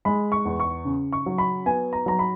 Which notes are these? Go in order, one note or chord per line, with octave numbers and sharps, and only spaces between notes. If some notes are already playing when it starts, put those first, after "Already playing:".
G#3 B5
C#6
E2
C#6
C#3
C#6
F#3
B5
B3 G#5
A#5
F#3 A#5
B5